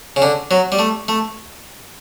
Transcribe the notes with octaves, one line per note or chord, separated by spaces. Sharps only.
C#3
D3
F#3
G3
A3
A3